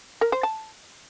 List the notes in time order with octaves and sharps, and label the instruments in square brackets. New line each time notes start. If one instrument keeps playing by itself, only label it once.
[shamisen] A#4
C5
A5